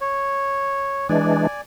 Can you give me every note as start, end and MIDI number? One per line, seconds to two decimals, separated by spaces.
0.01 1.07 73
1.09 1.47 52
1.09 1.47 56
1.09 1.47 62
1.09 1.61 74
1.09 1.61 80